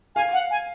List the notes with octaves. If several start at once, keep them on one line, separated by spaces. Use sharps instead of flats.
F5 G#5
F#5
G#5